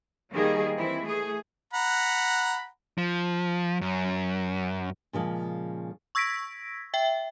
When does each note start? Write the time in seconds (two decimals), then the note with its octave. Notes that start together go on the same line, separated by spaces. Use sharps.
0.31 D#3 G3 A#3 G#4
0.75 E3 C4 E4
1.04 A3 G#4
1.73 F#5 A#5 B5
2.98 F3
3.81 F#2
5.13 A#2 C#3 F3 G#3
6.15 C#6 E6 G#6 A#6 B6 D7
6.94 E5 G5